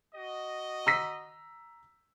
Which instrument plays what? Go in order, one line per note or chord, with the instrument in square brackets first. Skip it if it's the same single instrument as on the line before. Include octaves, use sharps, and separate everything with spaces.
[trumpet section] F#4 D#5
[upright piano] A#5 E6 B6